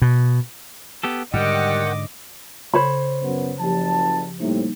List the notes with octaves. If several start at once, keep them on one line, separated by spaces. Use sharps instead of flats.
B2
B3 G4 A4
G#2 D3 D#3 G3 D#5 F#5 G5 D6
C#3 A4 C5 C#5 B5
F#2 B3
F#1 F3 G4 A5
A2 C3 G3 A#3 D#4